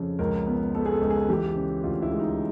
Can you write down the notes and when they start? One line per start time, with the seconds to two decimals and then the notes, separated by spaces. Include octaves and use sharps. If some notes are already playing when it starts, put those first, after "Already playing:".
Already playing: F2 C#3
0.19 C#2 A#4
0.47 B3
0.75 B3 A4
0.86 G#4
0.92 A4
1.01 C#2
1.10 G#4
1.29 E3 G4
1.56 C#3
1.84 D2 F4
2.02 E4
2.11 G#3
2.20 D#4